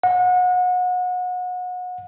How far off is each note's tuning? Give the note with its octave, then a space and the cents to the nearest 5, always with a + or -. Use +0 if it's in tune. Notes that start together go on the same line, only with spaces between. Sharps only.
F#5 -30